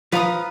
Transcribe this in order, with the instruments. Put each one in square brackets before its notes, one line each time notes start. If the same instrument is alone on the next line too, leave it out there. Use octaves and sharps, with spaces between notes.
[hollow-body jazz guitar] F3 [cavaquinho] B4 F5 A#5 D#6